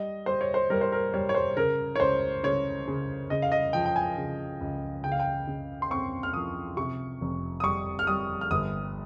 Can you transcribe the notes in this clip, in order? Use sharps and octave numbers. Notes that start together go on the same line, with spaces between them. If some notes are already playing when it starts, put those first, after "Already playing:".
Already playing: G3 D#5
G3 C5
C#5
C5
G3 A#4
C5
A#4
G3 C#5
C#5
C5
C#3 A#4
C#5
C#2 C5
C#3 C#5
C#3
C#3 D#5
F5
D#5
F3 G5
G5
G#5
C#3
C#2
C#3 G5
F5
G5
C#3
C6
C4 C#6
F6
F3 D#6
C3 C#6
F1
D#6
G3 C#6
F6
G3 D#6
F6
G1 D#6